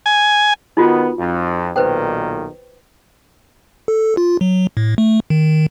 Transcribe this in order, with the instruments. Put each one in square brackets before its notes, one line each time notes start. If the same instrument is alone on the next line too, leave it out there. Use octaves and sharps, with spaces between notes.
[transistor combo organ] G#5
[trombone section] D#3 B3 [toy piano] D#4 F4 F#4
[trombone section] F2
[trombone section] B1 A#2 D#3 [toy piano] B4 C5 G5
[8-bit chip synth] A4
F4
F#3
A2
A3
D#3